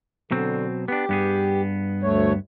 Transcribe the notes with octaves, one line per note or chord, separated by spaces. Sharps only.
B2 D3 F#3 C4
B3 D4 G4
G2 B3 G#4
D2 A3 C#5